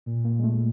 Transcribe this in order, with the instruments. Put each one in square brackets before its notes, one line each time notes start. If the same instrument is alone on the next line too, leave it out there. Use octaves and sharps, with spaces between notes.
[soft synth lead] A#2
[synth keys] A#3
G#3
A3